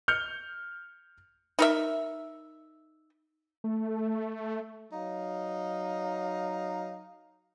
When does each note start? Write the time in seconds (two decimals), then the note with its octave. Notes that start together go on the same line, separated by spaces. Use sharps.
0.08 F6 G6 C#7 F7
1.59 D#4 A#4 E5
3.64 A3
4.91 F#3 D#4 F5